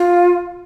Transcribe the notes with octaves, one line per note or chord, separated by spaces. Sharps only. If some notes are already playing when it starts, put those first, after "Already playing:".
Already playing: F4